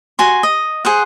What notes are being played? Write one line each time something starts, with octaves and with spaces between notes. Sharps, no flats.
F#4 G#5 C6
D#5
G#4 C5 F#5